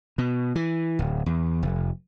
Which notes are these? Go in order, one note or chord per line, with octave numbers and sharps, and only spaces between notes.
B2
E3
D1
E2
F1